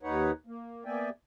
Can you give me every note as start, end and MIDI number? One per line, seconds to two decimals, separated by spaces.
0.03 0.31 39
0.03 0.31 63
0.03 0.31 71
0.03 0.31 73
0.03 0.31 78
0.47 0.85 58
0.85 1.09 58
0.85 1.09 59
0.85 1.09 74
0.85 1.09 76
0.85 1.09 79
0.85 1.09 80